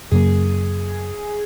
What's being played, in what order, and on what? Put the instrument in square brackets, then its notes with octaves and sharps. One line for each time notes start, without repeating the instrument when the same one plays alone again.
[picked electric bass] F#2 C#3 F#3 A#3 [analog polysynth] G#4